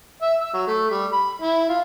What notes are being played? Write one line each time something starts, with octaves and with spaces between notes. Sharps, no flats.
E5
E6
F#3
A3
G3
B5
E4
F4